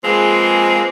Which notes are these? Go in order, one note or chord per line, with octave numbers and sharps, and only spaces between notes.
F3 G#3 A#3 C4 G#4 B4